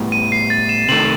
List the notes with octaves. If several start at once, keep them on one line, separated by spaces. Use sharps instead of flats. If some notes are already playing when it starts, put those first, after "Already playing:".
Already playing: A2 G3 B3 E4
D#7
C7
A6
E7
C3 D#3 A3 F#7